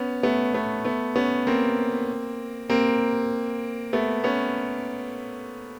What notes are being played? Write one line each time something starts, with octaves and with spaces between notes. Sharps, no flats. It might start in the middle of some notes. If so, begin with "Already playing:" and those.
Already playing: B3 C#4
A3 B3
A3 B3
A3 B3
B3 C#4
A#3 C4
A#3 C4
A3 B3
B3 C#4